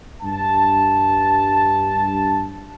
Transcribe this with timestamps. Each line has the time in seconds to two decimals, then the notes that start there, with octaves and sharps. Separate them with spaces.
0.22 G2 A5